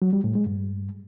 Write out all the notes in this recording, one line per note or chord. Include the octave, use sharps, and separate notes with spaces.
F#3
G3
A2
G#3
G2